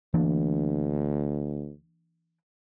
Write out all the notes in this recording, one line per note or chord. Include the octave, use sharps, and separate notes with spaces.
D2 E3 A#3 D4